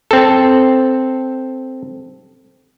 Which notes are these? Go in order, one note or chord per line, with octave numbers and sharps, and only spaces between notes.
C4 A4